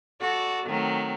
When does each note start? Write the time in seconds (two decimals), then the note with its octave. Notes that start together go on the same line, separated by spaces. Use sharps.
0.21 F#4 A4 D5
0.66 D#3 F#3 A3 C4